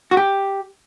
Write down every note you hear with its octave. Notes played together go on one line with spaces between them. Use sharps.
F#4
G4